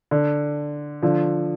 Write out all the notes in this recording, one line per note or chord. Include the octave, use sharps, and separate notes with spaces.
D3
D3 F3